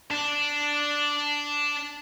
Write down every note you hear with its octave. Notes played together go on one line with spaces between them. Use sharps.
D4